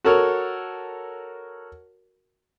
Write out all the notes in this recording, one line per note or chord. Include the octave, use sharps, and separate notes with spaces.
F#4 A4 A#4 C#5